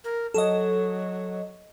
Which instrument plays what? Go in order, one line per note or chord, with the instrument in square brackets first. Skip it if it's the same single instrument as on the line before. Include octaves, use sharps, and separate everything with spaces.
[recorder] A#4
[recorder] F#3 [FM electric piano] A4 D#5